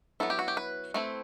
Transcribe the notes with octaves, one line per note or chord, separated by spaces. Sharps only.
F#3 B3 E4 A4
G4
F#4
G4
B4
A3 C4 E4